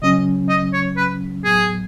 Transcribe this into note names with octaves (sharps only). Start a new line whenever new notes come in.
C#3 F#3 C#4 D#5
D#5
C#5
B4
A2 F#3 B3 G#4